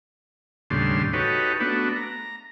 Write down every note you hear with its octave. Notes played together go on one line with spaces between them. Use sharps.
D#2 A2 C#3 G3 D4 C6
D#4 F#4 G4 A4 B4 C#5
A3 B3 D4 F#4
A#5